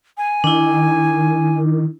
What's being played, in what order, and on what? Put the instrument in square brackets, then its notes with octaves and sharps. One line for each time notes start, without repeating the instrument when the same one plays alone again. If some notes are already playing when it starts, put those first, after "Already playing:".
[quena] G#5
[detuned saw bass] D#3 [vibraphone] D4 E4